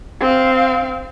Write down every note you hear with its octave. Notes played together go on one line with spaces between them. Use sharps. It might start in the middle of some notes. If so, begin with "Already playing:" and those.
C4 F5